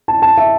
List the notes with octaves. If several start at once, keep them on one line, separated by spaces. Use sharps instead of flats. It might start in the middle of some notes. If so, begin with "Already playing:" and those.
A5
A5
E5